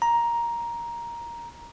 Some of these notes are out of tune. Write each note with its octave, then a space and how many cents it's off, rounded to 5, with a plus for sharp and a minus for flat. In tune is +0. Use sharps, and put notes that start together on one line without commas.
A#5 +10